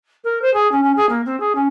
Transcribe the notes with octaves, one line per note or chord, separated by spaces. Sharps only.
A#4
C5
G#4
C#4
C#4
G#4
A#3
C4
G#4
C#4